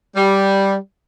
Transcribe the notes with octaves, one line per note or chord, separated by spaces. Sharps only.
G3